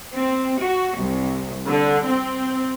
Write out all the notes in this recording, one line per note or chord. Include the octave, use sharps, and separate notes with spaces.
C4
F#4
C2
D3
C4